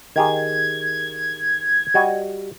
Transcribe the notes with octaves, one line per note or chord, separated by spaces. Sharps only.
D#3 G4 G#4 G#6
G3 F#4 D#5